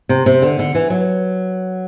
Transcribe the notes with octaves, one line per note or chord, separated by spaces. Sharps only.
C3
C3
D3
D3
E3
F#3